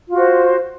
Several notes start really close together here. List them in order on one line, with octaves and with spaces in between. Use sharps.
F4 F#4 C5